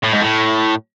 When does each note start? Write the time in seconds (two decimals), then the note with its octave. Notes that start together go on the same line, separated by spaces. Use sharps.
0.03 A2
0.13 G#2
0.21 A2